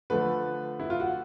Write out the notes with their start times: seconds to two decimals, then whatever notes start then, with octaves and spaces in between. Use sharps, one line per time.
0.10 D3 F3 A3 B4
0.80 E4
0.90 F4
1.00 F#4